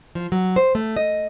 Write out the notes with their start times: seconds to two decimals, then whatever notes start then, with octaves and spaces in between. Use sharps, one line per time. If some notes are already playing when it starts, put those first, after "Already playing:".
0.15 F3
0.32 F#3
0.56 C5
0.75 A3
0.96 D#5